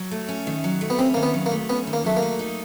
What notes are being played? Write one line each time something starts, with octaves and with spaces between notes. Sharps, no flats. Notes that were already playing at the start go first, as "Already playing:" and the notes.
Already playing: F#3
A3
C#4
D#3
F#3
A3
B3
C4 C#4
D#3 A#3
B3
F#3
A#3
A3
B3 C#4
D#3
A#3
F#3 A3
A#3
A3
D#4